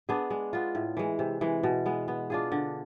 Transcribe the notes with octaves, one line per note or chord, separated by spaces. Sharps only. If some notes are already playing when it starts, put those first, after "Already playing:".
B3 D4 G#4
G#3
B3 F4
A2
E3 G#3
C3
E3 G#3
B2
G#3 B3
B3
D4 F4 G#4
D3